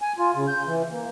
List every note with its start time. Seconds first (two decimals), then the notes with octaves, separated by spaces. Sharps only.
0.02 G#5
0.18 F4
0.35 C#3
0.48 G6
0.67 E3
0.92 A#3